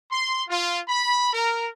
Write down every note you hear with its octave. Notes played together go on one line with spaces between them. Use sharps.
C6
F4
B5
A#4